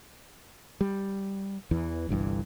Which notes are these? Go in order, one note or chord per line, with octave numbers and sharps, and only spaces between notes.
G3
E2 E3
G1 C2 G2 E3